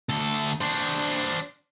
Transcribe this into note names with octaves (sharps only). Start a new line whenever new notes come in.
D2 A4
D4 C5